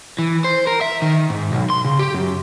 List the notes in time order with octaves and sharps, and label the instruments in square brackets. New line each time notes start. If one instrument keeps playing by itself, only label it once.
[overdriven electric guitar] E3
C5
A#4
E5
D#3
G#2
B1
C6
C#3
G4
F#2